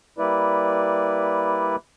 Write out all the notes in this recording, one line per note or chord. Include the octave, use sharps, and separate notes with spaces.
G3 A#3 E4 B4 D5